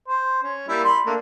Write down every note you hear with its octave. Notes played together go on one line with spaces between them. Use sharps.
C5
C#4
G3 A#3 E4
B5 C6
A3 A#3 D4